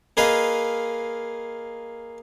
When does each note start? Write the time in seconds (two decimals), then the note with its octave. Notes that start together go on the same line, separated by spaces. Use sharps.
0.17 A#3 G#4 B4 D#5 F5